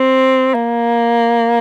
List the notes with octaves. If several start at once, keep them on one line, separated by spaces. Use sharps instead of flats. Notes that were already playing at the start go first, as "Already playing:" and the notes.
Already playing: C4
A#3